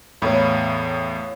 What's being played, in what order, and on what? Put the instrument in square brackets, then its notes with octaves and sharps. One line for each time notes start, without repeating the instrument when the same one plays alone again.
[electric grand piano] E2 A2 [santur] C#5 F5 B5